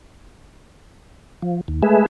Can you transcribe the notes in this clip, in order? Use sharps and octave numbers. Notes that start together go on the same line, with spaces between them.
F3
D#2
G#3 A3 G#4 B4 E5